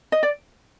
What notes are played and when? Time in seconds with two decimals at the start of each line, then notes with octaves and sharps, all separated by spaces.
0.12 D#5
0.23 D5